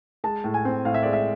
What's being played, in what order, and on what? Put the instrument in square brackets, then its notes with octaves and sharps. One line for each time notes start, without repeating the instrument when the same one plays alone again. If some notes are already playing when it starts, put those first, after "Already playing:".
[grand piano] G#3 A5
A2
G#5
C4
A2 F5
E5
G#3 D5
E5